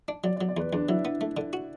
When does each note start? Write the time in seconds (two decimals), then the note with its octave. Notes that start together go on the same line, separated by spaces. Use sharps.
0.08 D4
0.24 F#3 D5
0.36 D5
0.41 F#3
0.49 D5
0.57 E2 B4
0.73 E2 D4
0.89 F#3 E4
1.05 B3 D4
1.21 A3
1.37 D3
1.53 F#4